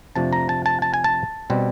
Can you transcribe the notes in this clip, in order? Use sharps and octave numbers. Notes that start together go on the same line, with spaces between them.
F2 C3 F3 A3 D4 A5
A#5
A5
A5
A5
G#5
A5
B2 G3 C4